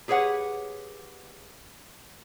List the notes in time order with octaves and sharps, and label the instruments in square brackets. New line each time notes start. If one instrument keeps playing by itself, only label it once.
[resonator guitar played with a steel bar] G4 G#4 B4 C#5 F#5